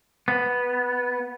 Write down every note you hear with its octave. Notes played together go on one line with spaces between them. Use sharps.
B3